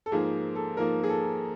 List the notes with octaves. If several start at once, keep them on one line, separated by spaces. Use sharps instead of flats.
A4
G#2 F3 A#3 G#4
A4
G#2 F3 A#3 A#4
G#4
A4